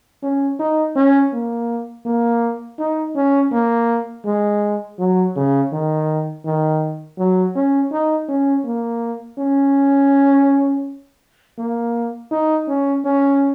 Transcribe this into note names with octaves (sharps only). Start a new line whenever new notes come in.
C#4
D#4
C#4
A#3
A#3
D#4
C#4
A#3
G#3
F#3
C#3
D#3
D#3
F#3
C#4
D#4
C#4
A#3
C#4
A#3
D#4
C#4
C#4